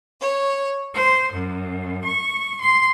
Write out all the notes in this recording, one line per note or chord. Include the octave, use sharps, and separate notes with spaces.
C#5
C5
F#2
C#6
C6